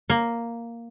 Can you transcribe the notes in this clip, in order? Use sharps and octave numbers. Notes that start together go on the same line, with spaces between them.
A#3